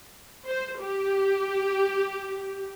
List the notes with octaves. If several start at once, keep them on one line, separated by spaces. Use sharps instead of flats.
C5
G4